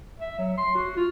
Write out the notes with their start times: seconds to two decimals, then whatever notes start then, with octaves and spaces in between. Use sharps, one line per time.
0.20 E5
0.39 F#3
0.58 C6
0.75 F#4
0.97 F4